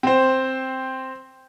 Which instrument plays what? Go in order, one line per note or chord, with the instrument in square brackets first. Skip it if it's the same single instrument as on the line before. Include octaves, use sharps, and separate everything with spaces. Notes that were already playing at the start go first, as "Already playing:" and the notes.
[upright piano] C4 C5